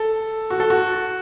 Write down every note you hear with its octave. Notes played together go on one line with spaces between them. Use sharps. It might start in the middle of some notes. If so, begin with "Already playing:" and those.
Already playing: A4
F#4
A4
F#4